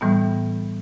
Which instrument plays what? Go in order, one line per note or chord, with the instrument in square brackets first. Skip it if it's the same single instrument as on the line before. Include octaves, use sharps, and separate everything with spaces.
[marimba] A2 E3 G3 B3